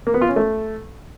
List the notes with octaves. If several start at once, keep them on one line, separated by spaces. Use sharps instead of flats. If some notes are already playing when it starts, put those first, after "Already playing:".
A#3
B3
F4
C#4
A3